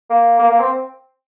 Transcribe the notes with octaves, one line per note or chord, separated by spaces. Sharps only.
A#3
A#3
A#3
C4